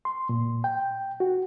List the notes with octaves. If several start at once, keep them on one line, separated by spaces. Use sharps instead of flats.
C6
A#2
G5
F#4